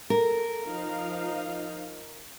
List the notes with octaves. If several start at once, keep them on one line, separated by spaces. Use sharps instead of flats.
A4 A#4
F3 D#4 F5